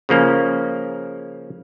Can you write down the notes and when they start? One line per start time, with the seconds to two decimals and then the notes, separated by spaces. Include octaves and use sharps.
0.09 C#3 F3 A#3 C#4